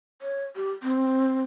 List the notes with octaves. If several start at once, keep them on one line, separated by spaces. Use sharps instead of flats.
C#5
G4
C4